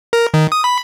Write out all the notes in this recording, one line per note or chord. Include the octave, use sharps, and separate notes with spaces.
A#4
D#3
D#6
B5